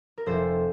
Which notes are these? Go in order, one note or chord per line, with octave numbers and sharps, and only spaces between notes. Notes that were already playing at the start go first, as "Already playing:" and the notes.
A#4
F1 F2 C3 A4 C5